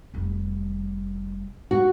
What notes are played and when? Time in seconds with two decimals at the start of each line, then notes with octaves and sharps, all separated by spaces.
0.14 F1 G3
1.71 F#4